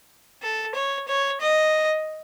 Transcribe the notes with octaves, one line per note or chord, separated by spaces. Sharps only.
A4
C#5
C#5
D#5